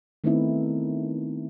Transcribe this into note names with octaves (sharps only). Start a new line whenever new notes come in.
D#3 A3 B3 C4 D#4 E4